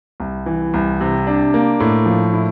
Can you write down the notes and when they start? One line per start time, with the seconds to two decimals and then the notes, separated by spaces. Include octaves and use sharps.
0.20 C2
0.46 E3
0.74 C2
1.01 C3
1.27 D4
1.54 A#3
1.80 A2
2.06 F3
2.34 E4